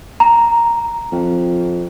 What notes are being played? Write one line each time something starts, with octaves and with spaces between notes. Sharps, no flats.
A#5
F2